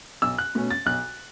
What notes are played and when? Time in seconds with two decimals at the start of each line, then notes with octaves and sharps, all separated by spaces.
0.22 B1 E6
0.38 F#6
0.55 B2 A3 C#4
0.70 A6
0.86 B1 F#6